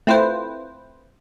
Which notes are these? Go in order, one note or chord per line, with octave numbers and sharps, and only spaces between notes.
A3 C4 E4 F4 B4 C5